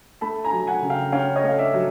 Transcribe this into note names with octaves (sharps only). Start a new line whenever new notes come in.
A3 A5 B5
G#5 A#5
F#3
F#5 G#5
C#3
F5 G5
C#4 F5 G5
C#5 D#5
A3 F5
D5 E5
F#3